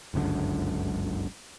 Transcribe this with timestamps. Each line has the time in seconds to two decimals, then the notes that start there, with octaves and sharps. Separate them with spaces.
0.14 G1 C#2 F#2 D3